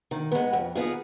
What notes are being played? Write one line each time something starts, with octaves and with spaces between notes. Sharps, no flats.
D#3
G#3 B3
F2
D#3 B3 F4 G#4